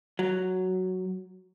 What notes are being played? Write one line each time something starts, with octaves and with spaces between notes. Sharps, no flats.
F#3